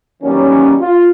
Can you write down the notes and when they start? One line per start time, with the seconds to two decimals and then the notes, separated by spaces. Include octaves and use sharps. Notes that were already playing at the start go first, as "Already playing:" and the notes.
0.23 D#3 E3 F#3 G3 A#3 C#4
0.81 F4